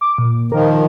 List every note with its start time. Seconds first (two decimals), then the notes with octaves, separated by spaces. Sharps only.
0.01 D6
0.18 A#2
0.52 D#3 F3 A#4